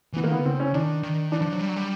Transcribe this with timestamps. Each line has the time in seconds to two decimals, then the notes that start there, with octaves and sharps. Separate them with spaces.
0.13 E3 B3
0.24 D#3 A#3
0.32 D3 B3
0.45 C#3 C4
0.60 C#4
0.74 D#3 D4
1.03 D#3
1.32 E3 D4
1.41 F3
1.52 F#3
1.61 G3
1.69 F#3
1.76 G3